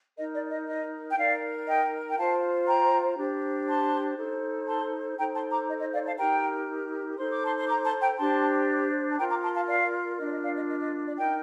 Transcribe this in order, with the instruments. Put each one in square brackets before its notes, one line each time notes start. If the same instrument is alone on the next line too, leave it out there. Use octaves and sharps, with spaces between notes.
[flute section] D#4 A#4 D#5
D5
D#5
D#5
G5
D#4 A#4 D5 F5
D#5 G5
G5
F4 C5 F5 A5
G5 A#5
D4 G4 C5
A5 C6
D#4 A4 C5
A5 C6
D#4 A4 C5 G5 A#5
A5 C6
A#5 D6
D#5
D#5
D5 F5
F5 A5
D#4 G4 A#4 G5 A#5
D#4 A4 C5 C6
D6
A5 C6
C6
A#5 D6
A5 C6
G5 A#5
D4 G4 C5 A5 C6
A5
F4 A#4 G5 A#5
A#5 D6
A5 C6
F5 A5
D5 F5
D4 F4 A#4 D#5
D5
D#5
D5 F5
D#5
D#5
D#5
D5
D#4 A#4 D#5 G5